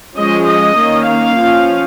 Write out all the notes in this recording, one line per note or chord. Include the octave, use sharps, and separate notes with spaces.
F3 G#3 C#4 D#5
D#5
D#3 A#3 C#4
F5
F3 C#4